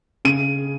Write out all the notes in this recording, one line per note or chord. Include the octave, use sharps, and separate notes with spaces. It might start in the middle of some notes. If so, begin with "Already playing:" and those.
C#3 D#7